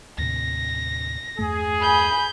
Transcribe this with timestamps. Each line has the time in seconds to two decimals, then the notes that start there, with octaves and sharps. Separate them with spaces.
0.18 D#2 A2 C3 A#6
1.39 E2 G2 A3 G#4
1.82 G#5 B5 G6